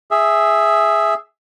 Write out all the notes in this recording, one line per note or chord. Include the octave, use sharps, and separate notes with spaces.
G#4 E5